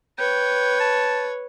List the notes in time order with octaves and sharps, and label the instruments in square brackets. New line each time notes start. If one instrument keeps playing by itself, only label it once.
[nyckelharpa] B4 C#5 [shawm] G5
[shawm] A5